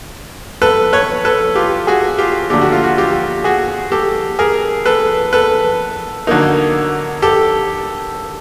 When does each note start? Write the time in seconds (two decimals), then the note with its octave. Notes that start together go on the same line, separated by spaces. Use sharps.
0.62 A4 B4
0.93 B4 C#5
1.25 A4 B4
1.55 F4 G4
1.87 F#4 G#4
2.18 F4 G4
2.50 D#2 D3 F#3 A3 D4 G4
2.61 F#4
2.72 F4
2.84 F#4
2.98 F4 G4
3.44 F#4 G#4
3.92 G4 A4
4.39 G#4 A#4
4.86 A4 B4
5.33 A4 B4
6.27 D3 F#3 A#3 D#4
7.22 G4 A4